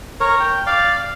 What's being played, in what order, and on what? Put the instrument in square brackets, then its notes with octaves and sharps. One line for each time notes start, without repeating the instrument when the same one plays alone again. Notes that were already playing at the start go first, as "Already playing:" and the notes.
[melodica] A#4 C#5
G5
D5 F5